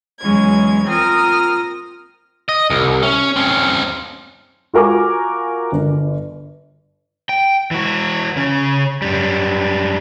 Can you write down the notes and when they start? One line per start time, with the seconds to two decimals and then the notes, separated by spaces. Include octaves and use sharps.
0.19 E2 F#3 G#3 C#4 G#6
0.87 C4 F4 A#4 D#6 F6
2.49 D#5
2.70 C2
3.03 C#4
3.36 C4 C#4
4.73 F4 F#4 A#4 G#5 D6
5.72 G1
7.29 G5
7.71 E3 F#4
8.37 C#3 C#4
9.02 F#2 G3